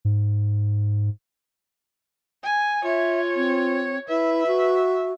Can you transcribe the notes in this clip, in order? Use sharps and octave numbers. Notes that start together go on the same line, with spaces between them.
G#2
G#5
F4 C#5 E5
C4
E4 B4 E5
F#4